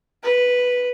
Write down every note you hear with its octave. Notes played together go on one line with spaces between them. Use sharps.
B4